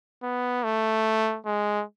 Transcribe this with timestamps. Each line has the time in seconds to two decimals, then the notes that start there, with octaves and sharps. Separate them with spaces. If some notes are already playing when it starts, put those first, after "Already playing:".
0.23 B3
0.63 A3
1.46 G#3